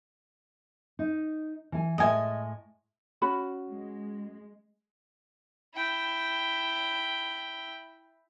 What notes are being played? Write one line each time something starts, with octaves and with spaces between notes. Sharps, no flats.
D#4
E3 G#5
A2 G#3 D#5 E5 G#5
C#4 F#4 B5
G#3
E4 G5